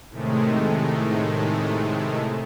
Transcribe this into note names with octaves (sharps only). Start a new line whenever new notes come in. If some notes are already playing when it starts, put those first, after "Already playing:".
A2 C3 D#3 G#3 A3